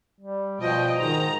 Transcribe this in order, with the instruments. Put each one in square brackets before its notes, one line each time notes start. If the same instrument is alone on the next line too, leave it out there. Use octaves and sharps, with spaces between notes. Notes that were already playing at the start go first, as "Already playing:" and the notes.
[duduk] G3
[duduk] B2 [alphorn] F3 [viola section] D#5 G5
[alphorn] G#2 [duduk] D#3 [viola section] A#5